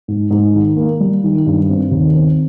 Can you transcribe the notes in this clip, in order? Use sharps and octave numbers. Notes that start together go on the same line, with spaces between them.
G#2
G#2
D#3
A#3
G3
D#3
G2
C4
D#2
C4